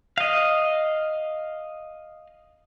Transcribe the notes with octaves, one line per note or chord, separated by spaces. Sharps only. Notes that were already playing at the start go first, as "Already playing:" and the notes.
D#5 F5